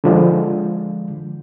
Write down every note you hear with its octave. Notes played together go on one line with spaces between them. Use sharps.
D3 F3 G#3